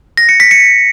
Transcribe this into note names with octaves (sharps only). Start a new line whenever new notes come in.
A#6
C#7
B6
C#7